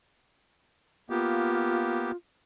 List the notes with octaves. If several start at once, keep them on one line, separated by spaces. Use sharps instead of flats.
A#3 B3 F4 G4